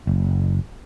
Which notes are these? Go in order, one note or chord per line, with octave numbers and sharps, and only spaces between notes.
F#1